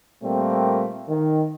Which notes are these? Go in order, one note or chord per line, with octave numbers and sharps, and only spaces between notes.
A#2 G3 A3 A#3 C4
D#3